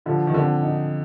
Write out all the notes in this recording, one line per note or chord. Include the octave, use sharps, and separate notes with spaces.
D3 F3
D#3
D3 C4
D#4